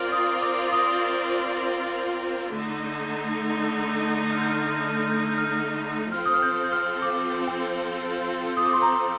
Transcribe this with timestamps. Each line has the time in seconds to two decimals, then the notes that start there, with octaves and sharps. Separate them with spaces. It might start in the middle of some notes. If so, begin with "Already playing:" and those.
Already playing: C4 F4 A#4 D5 F6
0.12 D#6
0.42 D6
0.72 D#6
2.52 D3 A3 D#4
4.32 F6
4.41 G6
4.50 F6
4.59 G6
4.67 F6
4.76 G6
4.85 F6
4.94 G6
5.03 F6
5.11 G6
5.21 F6
5.29 G6
5.38 F6
5.47 G6
5.55 F6
6.12 F3 C4 F4 A4 F6
6.26 D#6
6.34 F6
6.42 G6
6.64 G6
6.72 F6
7.02 D6
7.48 G5
8.57 D#6
8.66 D6
8.73 C6
8.82 A#5